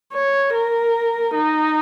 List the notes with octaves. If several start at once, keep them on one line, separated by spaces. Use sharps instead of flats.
C#5
A#4
D#4